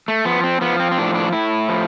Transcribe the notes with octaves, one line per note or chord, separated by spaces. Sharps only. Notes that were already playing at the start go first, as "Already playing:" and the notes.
A3
F3 B3
C4
F3 B3
C4
C4
A2 D4
D4
A2 E4
F3